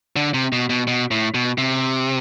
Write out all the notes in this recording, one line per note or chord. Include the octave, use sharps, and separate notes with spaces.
D3
C3
B2
B2
B2
A2
B2
C3